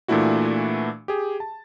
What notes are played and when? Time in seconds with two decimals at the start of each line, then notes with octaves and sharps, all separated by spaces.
0.08 A#2 E3 A3 D4 E4 F#4
1.08 G4 G#4
1.40 A5